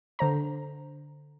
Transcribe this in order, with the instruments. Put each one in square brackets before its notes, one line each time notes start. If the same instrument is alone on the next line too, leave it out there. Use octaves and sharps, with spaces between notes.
[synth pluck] D3 C5 A#5